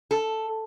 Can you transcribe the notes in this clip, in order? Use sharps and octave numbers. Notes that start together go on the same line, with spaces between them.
A4